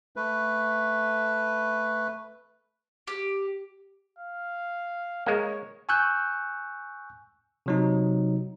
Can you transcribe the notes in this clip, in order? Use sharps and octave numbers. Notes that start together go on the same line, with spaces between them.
A3 B4
G4
F5
G#3 A#3 C#5
G#5 C#6 E6 F#6 G6
C3 F#3 D#4